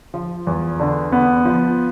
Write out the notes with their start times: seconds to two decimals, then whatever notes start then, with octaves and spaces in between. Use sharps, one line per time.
0.14 F3
0.47 E2
0.80 D3
1.12 B3
1.45 F3